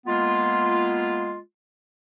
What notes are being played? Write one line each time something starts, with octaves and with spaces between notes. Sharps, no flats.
G#3 A#3 B3 F4